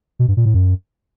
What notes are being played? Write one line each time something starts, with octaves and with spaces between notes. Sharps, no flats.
B2
G2
A#2
A2
F#2